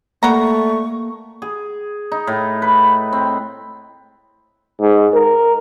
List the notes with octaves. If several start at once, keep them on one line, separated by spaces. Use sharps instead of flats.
G3 A3 A#3 F#5 A#5 C#6
G#4
D#4
A2
B4
C4
G#2
A#4